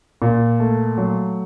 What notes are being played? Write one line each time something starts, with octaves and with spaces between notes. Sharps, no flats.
A#2
A3
F#3